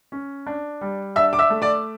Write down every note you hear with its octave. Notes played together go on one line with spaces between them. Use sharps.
C#4
D4
G3
D4 E5 E6
D6
E5 E6
A3
D5 D6